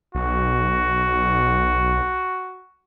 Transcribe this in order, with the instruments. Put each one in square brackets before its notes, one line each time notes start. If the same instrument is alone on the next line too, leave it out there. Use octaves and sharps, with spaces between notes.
[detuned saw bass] B1 [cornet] F#4